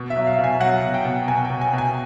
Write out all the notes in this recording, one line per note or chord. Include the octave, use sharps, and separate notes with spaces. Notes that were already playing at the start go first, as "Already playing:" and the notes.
Already playing: B2
E5
F#3
F5
B2
G#5
F#3 F#5
B2
G5
B2
B2 G#5
G5
B2
G#5
B2
G#5